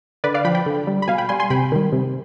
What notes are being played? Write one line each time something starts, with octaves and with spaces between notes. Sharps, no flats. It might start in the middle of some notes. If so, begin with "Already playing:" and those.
D3 B4 D5
D5 F5
F3 G5 B5
G5 B5
D3
G3
B5
B2 F5 G#5
G5 B5
G3 G#5 C6
G#5 C6
C3 G5 B5
D#3 G3
C3